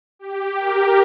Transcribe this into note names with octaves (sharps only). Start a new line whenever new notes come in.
G4
A#4